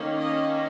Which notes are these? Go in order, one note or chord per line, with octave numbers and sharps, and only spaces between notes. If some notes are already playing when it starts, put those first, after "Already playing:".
Already playing: D#3 A#3 C#4
D#5